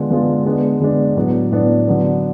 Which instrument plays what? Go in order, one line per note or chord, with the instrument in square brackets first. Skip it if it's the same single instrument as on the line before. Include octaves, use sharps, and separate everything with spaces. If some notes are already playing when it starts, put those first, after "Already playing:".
Already playing: [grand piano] D3 G#3 B3 F4
D3 G#3 B3 F4
D3 G#3 B3 D4
D3 G#3 B3 D4
A2 F#3 B3 D4
A2 F#3 B3 D4
D3 F#3 B3